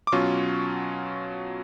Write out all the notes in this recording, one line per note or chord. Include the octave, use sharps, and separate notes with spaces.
D6
B2 F#3 C#4 F4 C#6